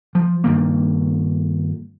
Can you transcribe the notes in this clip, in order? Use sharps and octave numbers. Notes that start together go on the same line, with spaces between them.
F3
G2 D#3 A#3